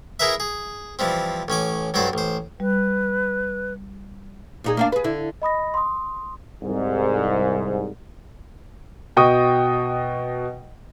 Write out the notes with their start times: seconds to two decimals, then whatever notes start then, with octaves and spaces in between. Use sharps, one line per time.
0.19 E4 G#4 A#4 B4 E5
0.40 G#4
0.99 E3 F3 G3 C4
1.48 A1 C#4 G#5 D6
1.94 B1 G2 F#3 C5 D5
2.13 A1 C5
2.60 G3 B4
4.64 A#2 D#4 G#4
4.77 A#3 D4 F5
4.92 G#4 B4
5.04 D3 E4
5.42 D#5 B5 D#6 A#6
5.74 C6 D#6
6.62 C2 G#2
9.17 B2 D#5 G5 C#6 D#6